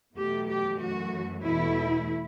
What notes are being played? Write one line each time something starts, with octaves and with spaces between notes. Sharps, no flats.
E2 B2 F#3 A3 G4
G4
F#2 E3 A3 F#4
E2 B2 A3 E4